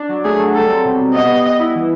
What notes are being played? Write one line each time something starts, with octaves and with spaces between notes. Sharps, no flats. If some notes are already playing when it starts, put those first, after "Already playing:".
Already playing: D4
F#3
A3 G#4
F#3
G3 A4
C4
B2
G3
B3 D#5
G3
B3
E4
E3